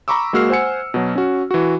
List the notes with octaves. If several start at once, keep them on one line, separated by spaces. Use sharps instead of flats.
A#5 B5 C#6 D6 E6
G#3 A#3 F#4 E6 F6 C7
C5 F#5 G#5 C#7
B2 F#3
C#4 F#4
E3 F#4